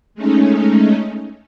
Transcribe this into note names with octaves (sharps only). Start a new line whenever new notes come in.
G#3 A3 C#4 D#4